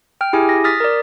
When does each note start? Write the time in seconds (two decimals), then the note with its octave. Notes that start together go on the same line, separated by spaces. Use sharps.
0.21 G5 F6
0.33 E4 G4 G#4 G#5
0.49 A#6
0.64 D#6 F6 A6 B6
0.80 A#4 D5